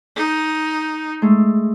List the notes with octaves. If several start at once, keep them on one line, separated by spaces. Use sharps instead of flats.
D#4
G#3 A3